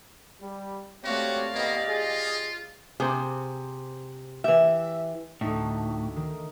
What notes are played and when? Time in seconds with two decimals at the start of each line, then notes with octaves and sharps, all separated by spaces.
0.41 G3
1.04 A3 C4 F#4 G4 C#5 D5 F5
1.54 A2 D#3 A#3 B3 G4 D#5
1.89 F4 G#4
3.00 C3 G#4 C5
4.44 E3 G4 E5
5.41 D2 A2 D#4 E5
6.16 D#3